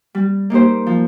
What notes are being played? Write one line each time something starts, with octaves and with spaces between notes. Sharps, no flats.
G3
A#3 D#4 G4 C5
F3